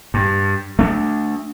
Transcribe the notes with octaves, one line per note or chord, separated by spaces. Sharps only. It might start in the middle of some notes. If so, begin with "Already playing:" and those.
G2
A3 D4